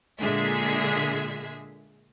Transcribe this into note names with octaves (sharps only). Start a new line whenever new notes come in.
A#2 D3 G#3 G#4 E5